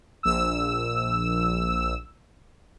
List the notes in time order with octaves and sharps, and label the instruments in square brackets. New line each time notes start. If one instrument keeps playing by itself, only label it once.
[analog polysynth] A#1 E6